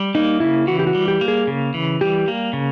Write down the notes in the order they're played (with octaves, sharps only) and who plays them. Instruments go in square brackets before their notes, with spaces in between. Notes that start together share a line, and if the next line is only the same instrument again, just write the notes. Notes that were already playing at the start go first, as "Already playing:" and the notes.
Already playing: [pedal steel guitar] G3
[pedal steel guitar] A#3 [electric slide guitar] D#4
[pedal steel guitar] C#3 [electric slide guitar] E4
[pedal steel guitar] E3 [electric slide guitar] F#4
[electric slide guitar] G4
F#4
[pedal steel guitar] G3
[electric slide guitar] G4
[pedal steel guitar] A#3
[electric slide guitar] G#4
[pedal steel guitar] C#3
E3
[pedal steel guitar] G3 [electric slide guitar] G4
[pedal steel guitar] A#3
C#3